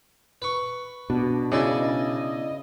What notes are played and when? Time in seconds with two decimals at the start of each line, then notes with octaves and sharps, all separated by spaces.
0.42 B4 C#6
1.10 B2 D4
1.52 C#3 D4 E4 D5 D#5